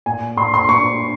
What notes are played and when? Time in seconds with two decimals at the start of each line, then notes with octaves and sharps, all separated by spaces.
0.06 A#2 G#5
0.37 A#2 C6
0.54 C6
0.69 A#2 C#6